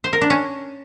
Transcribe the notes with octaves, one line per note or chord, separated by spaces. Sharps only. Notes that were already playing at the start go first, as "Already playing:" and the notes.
C5
A#4
D4
C#4